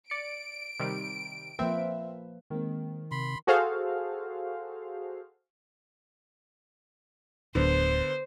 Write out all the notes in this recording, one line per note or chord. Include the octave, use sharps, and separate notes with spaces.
D5 C#7 D7
C3 D#3 G3
F3 A#3 C4 B4 E5
D#3 G#3 A#3 C4
C3 B5 C6
F#4 G#4 A4 C5 F5
D1 D3 B3 C5